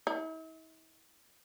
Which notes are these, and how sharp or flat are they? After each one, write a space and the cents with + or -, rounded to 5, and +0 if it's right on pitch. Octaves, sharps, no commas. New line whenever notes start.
E4 -45